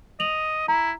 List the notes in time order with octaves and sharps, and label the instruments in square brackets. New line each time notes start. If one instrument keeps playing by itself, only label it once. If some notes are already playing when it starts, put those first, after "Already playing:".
[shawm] D#5 [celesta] F7 F#7
[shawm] E4 [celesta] A#5